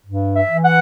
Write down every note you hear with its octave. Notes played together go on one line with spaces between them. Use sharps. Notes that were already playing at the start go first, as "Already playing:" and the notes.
G2
E5
E3
F#5